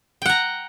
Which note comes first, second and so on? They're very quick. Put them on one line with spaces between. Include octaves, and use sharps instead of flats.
G5 F#5 A#5